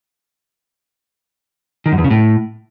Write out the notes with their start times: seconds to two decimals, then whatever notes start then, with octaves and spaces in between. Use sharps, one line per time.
1.86 D#3
1.92 F#2
1.98 E2
2.04 C#3
2.11 A2